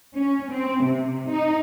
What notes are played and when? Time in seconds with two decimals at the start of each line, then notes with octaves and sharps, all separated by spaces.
0.15 C#4
0.51 C4
0.83 C3
1.30 D#4